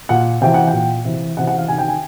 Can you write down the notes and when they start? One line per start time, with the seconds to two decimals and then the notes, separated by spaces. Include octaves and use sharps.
0.09 A#2 F#5
0.41 C3 E3 G5
0.54 F#5
0.68 G5
0.73 A#2
1.05 C3 E3
1.37 C3 E3 F#5
1.47 F#5
1.58 F5
1.68 C3 D#3 G#5
1.78 G5
1.88 G#5